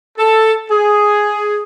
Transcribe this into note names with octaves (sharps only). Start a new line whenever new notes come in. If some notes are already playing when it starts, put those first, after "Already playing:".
A4
G#4